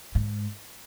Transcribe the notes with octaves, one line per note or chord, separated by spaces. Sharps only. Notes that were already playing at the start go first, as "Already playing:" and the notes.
G#2